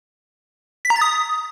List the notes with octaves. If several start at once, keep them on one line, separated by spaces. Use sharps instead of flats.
B6
A#5
A6
D#6